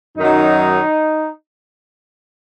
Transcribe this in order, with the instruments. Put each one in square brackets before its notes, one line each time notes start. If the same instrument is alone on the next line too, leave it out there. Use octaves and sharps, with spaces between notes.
[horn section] F#2 D#3 F#3 D#4